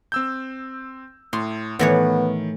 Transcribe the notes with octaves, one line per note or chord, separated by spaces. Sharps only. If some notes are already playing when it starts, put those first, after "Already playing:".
C4 E6 G6
A2 C6
A2 D#3 E3 B3 C#5